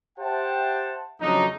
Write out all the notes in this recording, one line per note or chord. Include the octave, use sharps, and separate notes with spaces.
G4 C5 E5 F#5 G5 A5
F2 C#3 F#3 A3 D4 D#4